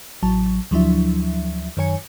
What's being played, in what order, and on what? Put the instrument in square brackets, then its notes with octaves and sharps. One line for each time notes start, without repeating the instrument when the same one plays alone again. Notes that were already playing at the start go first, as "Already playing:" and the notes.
[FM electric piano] A1 F#3 A5
D2 F3 F#3 D4 E4 E5
F#2 D#3 C#5 G#5 C#7